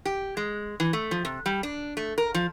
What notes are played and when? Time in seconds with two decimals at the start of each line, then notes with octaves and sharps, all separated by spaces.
0.05 G4
0.37 G#3
0.80 E3
0.93 A3
1.11 F3
1.25 C3
1.46 G3
1.63 D4
1.97 A3
2.18 A#4
2.34 F3